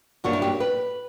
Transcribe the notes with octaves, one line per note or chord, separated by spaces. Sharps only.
G2 F#3 A#3 D4 F#4
E4
G4
B4